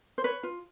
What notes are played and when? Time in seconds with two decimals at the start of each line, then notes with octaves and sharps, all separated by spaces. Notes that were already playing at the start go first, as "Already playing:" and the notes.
0.18 C5
0.24 B4 C#5
0.43 F4